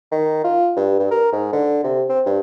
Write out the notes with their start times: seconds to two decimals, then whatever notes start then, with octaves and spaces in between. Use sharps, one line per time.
0.12 D#3
0.44 F4
0.77 G2
0.99 G2
1.11 A#4
1.32 G#2
1.53 D3
1.84 C3
2.09 C4
2.26 G2